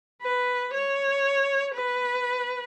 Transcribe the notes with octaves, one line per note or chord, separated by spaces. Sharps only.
B4
C#5
B4